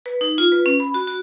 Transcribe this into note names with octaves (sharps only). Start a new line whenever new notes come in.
B4
D#4
F4
B4
C#4
B5
F#4
F#4